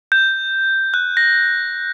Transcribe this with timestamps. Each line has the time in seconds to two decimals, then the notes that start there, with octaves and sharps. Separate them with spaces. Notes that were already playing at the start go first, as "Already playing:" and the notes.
0.12 G6
0.94 F#6
1.17 A#6